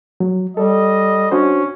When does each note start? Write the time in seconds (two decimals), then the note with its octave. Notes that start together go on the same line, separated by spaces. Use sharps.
0.20 F#3
0.57 G3 A4 D#5
1.31 C#4 D4 F#4 C5